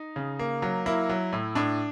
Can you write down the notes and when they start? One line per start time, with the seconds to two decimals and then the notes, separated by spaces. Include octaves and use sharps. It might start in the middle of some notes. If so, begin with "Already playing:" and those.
Already playing: D#4
0.16 C#3
0.39 A#3
0.62 F#3
0.86 A#3 E4
1.09 F#3
1.33 A2
1.55 A2 D4